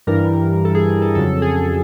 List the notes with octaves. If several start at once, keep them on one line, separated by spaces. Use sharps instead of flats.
G2 E3 G3 A#4
A4
G#4
G#4
A4
F2 C#3 F#3 A4
G#4